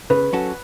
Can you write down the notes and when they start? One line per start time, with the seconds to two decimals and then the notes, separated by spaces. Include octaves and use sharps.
0.10 C#3 B4
0.33 F#3 C#4 F#4 A4